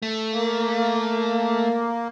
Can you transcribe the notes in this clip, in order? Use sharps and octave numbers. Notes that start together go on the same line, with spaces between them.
A3
A#3